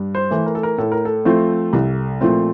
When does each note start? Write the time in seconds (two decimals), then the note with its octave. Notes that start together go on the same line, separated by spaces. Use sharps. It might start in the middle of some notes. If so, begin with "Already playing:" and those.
Already playing: G2
0.15 C5
0.30 E3 A3
0.46 A#4
0.55 A4
0.63 A#4
0.78 A2 A4
0.92 A#4
1.05 A4
1.25 F3 A3 C4
1.73 C2
2.21 A#2 F3 A3 C4